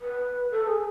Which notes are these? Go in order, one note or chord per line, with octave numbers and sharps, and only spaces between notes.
B4
A4
G#4